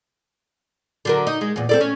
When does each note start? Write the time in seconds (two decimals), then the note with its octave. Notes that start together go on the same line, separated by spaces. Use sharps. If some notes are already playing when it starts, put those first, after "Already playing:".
1.05 D3 F#3 A#4
1.27 D#4
1.41 G#3
1.56 E2 A#2
1.69 C4 A4 D5
1.80 C#4